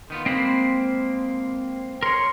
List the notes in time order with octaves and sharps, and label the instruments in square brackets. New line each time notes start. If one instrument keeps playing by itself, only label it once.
[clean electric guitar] D#3 B3 F4
[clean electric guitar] G#3 A#3 [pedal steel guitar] C4 C5 B5
[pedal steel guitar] A#4 C#5 [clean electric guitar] C6